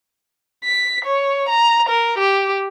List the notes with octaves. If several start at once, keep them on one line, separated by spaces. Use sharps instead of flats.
B6
C#5
A#5
A#4
G4